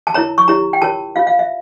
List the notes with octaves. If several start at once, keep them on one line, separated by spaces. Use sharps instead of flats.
A5
E4 A#4 C#5 A#5
C#6
E4 G4 C#5 A#5
G5
F4 A#4 C#5 A5
F4 C#5 F5
F5
E5